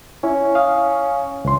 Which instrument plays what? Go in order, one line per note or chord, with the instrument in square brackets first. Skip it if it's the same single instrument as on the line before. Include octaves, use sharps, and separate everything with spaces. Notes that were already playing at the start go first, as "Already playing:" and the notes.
[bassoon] C#4 [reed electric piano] E4
[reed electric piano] F5 D#6
C#2 C6